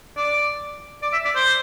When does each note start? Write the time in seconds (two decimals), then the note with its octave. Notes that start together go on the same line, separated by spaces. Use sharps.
0.17 D5
1.03 D5
1.13 E5
1.25 D5
1.36 C5